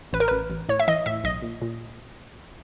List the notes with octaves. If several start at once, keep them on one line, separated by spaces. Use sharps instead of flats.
A1 B4
A#4
A1 B4
A1
A2 C#5
E5
E3 D#5
A2 E5
B1 D#5
A#2
A#2